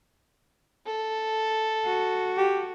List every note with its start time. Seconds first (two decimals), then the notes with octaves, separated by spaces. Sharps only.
0.86 A4
1.86 F#4
2.37 G4